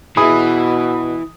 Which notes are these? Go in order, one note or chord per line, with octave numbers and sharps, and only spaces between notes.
B2 E3 E4 G#4 B5 D#6